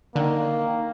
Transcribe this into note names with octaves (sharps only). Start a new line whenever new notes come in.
D3 D#3 A#3